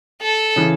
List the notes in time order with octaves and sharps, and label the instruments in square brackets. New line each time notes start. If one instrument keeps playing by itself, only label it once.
[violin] A4
[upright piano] C#3 E3